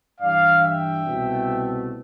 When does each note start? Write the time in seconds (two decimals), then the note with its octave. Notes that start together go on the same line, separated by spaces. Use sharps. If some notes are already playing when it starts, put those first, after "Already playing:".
0.20 G2 E3 G3 D5 F5
0.62 E5 G5
1.05 C2 B2 A3